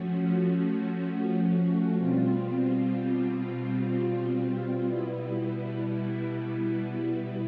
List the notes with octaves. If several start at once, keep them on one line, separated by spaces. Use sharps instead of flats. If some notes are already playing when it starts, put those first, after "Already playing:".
Already playing: F3 A3 C#4 F#4
B2 G3 C4 F4
B2 G3 B3 E4